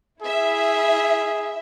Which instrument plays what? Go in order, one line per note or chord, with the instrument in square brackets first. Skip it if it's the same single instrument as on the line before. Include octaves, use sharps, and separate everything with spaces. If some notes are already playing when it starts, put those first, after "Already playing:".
[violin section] E4 E5 [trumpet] G#4